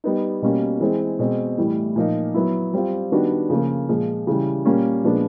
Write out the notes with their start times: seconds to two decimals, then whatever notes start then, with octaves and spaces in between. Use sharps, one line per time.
0.04 G3 B3 D#4
0.42 B2 G3 A#3 C#4
0.80 E3 G#3 C4
1.19 B2 G#3 C4
1.58 A2 E3 G3
1.96 A#2 F3 A#3 D#4
2.34 F#3 B3 E4
2.73 G3 C4 F4
3.12 D#3 G3 B3 D4 F#4
3.50 C#3 F3 A#3
3.88 A#2 F3 G#3
4.27 C#3 E3 G3
4.65 A#2 G3 A#3 C#4
5.04 A#2 F3 G#3 B3 D4